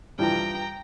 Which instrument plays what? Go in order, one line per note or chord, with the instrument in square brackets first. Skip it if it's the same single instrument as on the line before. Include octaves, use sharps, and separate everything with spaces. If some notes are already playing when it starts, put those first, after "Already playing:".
[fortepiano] G2 E3 F3 [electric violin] G5 A#5